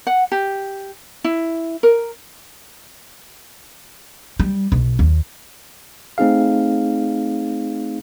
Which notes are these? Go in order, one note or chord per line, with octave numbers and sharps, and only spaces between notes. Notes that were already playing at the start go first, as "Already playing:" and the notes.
F#5
G4
E4
A#4
G3
B1
D#2
A3 C4 D#4 G#4 F5